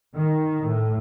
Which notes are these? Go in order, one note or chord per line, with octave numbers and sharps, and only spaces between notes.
D#3
A2